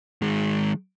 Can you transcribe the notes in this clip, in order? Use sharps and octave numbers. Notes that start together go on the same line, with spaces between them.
D#3 G#3